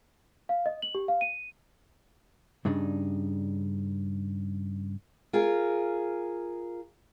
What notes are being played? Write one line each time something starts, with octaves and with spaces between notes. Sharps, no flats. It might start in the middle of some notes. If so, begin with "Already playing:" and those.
F5
D#5
F#7
G4
F5
D#7
G2 C#3 D4 D#4
F4 G#4 A#4